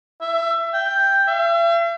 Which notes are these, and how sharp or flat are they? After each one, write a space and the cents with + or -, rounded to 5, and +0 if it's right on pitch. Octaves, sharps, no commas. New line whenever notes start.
E5 +25
G5 +5
E5 +45